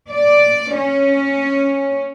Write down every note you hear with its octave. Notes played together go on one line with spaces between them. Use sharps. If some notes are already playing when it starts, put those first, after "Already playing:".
D5
C#4